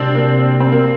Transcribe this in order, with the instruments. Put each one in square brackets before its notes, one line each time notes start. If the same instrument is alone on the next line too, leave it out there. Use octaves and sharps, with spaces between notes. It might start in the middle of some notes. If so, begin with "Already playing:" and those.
Already playing: [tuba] C3 [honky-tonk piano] C4 D4
[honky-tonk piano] A#3
C4
A#3